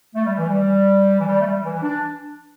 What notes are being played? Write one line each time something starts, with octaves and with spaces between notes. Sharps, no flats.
A3
G3
E3
G3
E3
G3
A3
G3
E3
D4